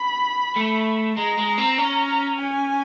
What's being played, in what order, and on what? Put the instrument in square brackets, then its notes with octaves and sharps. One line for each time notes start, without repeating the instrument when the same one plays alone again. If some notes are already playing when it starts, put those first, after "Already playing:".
Already playing: [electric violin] B5
[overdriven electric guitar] A3
[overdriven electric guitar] G#3 [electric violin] A#5
[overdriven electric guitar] G#3
C4
C#4
[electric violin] G#5